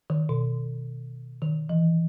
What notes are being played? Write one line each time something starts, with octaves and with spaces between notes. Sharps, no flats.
D#3
B2
D#3
E3